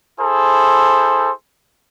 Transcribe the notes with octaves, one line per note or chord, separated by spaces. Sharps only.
E4 G#4 A4 C5